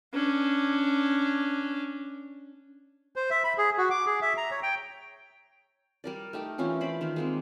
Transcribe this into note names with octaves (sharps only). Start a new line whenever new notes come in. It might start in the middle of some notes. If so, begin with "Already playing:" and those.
C#4 D4
C5
E5
B5
G#4
F#4
D6
G#4
E5
A#5
C#5
G5
G3 A#4 D5
A3 D#4 G4 A#4
E3 C#4 E4 F4
C5 D5 B5
D#3 A#4 C5
G#3 A#3 C4